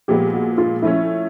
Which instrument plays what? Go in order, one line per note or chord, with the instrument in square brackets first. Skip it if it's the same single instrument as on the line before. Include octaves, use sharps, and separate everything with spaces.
[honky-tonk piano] A#2 F3 G#3 B3 [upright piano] G4
[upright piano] F#4
F4
[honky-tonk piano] F3 A3 C#4 [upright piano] E4